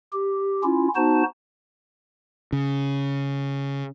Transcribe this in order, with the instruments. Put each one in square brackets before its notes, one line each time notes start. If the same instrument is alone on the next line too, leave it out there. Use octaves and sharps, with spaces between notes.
[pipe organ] G4
C#4 E4 F4
B3 D#4 F#4 C5 A5
[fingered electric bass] C#3